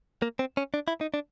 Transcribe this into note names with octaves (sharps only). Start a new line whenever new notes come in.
A#3
C4
C#4
D4
E4
D#4
D4